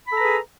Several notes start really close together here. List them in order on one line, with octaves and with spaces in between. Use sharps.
B5 A4 A#5 B4 G#4